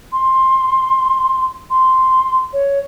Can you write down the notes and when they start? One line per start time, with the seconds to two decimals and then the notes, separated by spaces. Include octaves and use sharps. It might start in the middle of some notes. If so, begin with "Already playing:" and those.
0.12 C6
1.70 C6
2.53 C#5